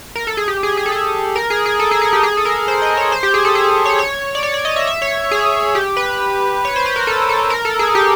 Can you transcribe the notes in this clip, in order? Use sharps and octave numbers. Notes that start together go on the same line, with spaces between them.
A#4
A4
G#4
G4
G#4
G#4
A4
G#4
A#4
G#4
G#4
A4
G#4
G#4
G4
G#4
A4
A#4
C5
D#5
C#5
C5
G4
G#4
A4
G#4
C#5
C#5
D5
C#5
D5
D#5
E5
E5
C#5
G#4
G4
B4
C#5
C5
B4
A#4
A4
A4
A#4
A4
G#4
G4